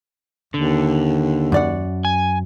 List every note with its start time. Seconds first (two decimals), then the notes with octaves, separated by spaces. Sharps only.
0.54 D#2 D3
1.52 F#2 D5 F#5
2.05 G#5